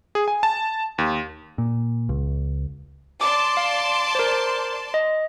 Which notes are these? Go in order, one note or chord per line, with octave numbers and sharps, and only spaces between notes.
G#4
G#5
A5
D#2
A#2
C#2
D5 A5 C6 D6
F5
A#4 C5
D#5